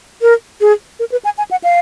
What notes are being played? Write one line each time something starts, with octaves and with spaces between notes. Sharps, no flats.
A#4
G#4
A#4
B4
G#5
G#5
F#5
F5